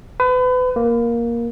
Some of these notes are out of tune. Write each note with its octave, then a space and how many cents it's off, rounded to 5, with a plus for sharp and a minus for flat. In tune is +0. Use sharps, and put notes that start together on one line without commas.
B4 +35
A#3 +10